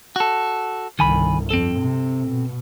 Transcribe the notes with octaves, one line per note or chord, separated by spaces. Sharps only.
F#4 A4
G1 C2 D#3 G#5 B5
F2 C4 A4
C3
B2